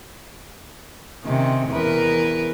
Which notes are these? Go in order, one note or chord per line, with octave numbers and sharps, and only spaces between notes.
C3 D#3 C#4
E2 A#4 B4